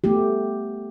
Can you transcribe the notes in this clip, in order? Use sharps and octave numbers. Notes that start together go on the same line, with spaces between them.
A3 B3 G4